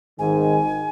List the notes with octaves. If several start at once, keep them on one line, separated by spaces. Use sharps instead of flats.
G#1 G#2 D#3 G#5